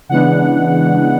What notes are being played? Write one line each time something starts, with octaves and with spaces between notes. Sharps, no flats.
C#3 E3 G#3 B3 D4 F#5